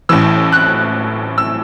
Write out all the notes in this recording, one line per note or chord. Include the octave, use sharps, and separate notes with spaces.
A1 A2 E3 E6
F#6
E6